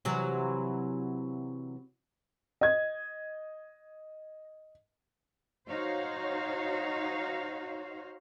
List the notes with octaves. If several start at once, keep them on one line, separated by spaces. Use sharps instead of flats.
C3 E3 F#3
D#5 G#6
D#4 F#4 C5 C#5 F5